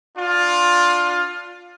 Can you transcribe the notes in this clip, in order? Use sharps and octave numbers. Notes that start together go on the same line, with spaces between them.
D4 F4